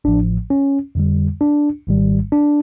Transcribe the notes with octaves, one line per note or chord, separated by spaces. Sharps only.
A1 A2 F3 D4
C#4
F2 D3 G3
D4
G#1 G#2 D#3 G3
D4